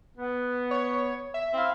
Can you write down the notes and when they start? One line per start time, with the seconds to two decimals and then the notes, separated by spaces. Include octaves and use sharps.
0.18 B3
0.71 C#5
1.34 E5
1.54 C4 E4 F5